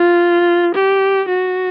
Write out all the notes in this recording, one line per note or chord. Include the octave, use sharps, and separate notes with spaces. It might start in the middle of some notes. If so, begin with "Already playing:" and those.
Already playing: F4
G4
F#4